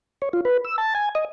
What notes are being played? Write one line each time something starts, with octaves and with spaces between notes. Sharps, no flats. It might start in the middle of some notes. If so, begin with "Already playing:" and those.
C#5
F4
B4
E6
A5
G#5
D#5